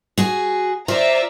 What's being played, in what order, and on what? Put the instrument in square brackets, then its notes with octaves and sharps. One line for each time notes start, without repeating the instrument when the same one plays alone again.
[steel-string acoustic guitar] F#4 G#4
[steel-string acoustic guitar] F4 C5 [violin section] D5 E5 A#5